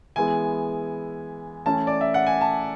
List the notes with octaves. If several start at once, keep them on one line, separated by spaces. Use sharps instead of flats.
E3 G#3 B3 E4 G#5
E3 A3 C#4 E4 A5
D5
E5
F#5
G#5
A5